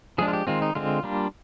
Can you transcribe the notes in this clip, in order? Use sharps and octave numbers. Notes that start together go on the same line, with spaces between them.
F3 G#3 D4 G#4
F4
G4
D#3 G#3 C4 F4
D#4
D3 G#3 C4 F4
G3 A#3 D4